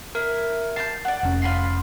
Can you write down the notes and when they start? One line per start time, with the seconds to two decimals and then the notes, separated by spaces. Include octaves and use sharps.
0.15 E4 A#4
0.76 A5 A#5 G6 C7
1.05 D5 F#5
1.23 F1 C#4
1.42 F4 B5 C6